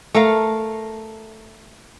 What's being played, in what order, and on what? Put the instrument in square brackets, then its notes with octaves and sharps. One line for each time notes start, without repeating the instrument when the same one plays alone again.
[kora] A3 A4 A#4 F5